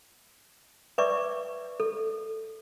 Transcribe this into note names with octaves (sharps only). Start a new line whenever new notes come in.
B4 D5 E5 C#6 D6
A4